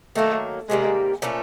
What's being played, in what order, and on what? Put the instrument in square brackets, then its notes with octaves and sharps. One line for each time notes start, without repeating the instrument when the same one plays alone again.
[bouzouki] D#3 F#3 A#3 [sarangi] A3
[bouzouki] C3 D#3 G3 A#3 [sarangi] G#3
[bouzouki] A#2 F3 A3 C#4